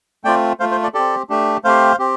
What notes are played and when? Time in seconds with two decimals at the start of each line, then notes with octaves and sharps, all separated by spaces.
0.25 A3 C4 F4 D5 G5
0.60 A3 F4 C5 F5
0.71 C5
0.82 A4 D5
0.94 C4 G4 A4 D5
1.30 A3 D4 G4
1.64 A3 C4 G4 C5 F5
1.99 C4 G4